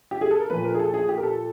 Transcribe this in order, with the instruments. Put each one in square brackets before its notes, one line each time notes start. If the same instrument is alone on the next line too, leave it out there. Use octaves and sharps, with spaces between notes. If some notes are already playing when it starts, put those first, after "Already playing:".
[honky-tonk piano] G4
G#4
A4
A#4
A#2 F3 A3 B4
A#4
G#4
A4
G#4
G4
A#4
A4